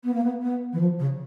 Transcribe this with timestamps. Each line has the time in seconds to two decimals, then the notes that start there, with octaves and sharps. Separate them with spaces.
0.03 B3
0.13 A#3
0.24 B3
0.41 B3
0.73 E3
0.80 F3
0.99 C#3